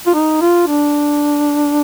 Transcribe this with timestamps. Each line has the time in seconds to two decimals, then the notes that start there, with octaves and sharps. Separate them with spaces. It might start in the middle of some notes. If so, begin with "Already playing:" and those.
0.06 F4
0.14 D#4
0.41 F4
0.67 D4